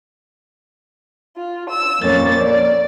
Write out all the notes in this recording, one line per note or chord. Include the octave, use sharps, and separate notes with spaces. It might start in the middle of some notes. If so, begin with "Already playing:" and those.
F4
E6
F2 A#2 A#3 C#4 A6
D5